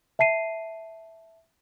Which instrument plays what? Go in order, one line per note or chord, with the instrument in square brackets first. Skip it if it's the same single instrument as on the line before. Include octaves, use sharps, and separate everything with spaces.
[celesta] E5 A5 C7 D#7